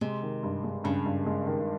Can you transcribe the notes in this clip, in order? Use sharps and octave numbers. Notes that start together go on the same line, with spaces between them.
C3 G#3
D#3
G2
G#3
G2 C#3
G2
G#3
D#3